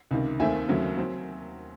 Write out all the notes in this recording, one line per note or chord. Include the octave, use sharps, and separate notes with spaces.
C#2 C3 D#3
D#2 D#3 A3 C4 E5 G#5
D#2 C#3 F#3 A3 C4
F#3 C4